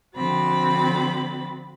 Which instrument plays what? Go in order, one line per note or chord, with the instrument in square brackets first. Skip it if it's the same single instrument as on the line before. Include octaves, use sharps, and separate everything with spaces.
[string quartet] D3 F3 C4 F#4 B5 A6